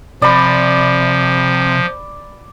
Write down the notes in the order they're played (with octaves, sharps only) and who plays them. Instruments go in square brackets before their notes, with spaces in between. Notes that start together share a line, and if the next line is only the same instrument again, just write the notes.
[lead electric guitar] C3 [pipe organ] F3 [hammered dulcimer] D5 B5